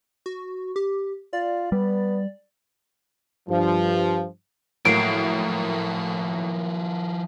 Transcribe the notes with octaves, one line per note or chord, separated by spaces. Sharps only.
F#4
G4
F4 D5
G3 B3
G2 F3
A2 F3 F#3 A#3 E4 C7 D7